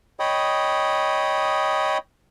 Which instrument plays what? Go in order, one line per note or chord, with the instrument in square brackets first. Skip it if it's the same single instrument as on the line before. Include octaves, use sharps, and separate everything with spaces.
[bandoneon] C#5 D#5 G5 B5 D#6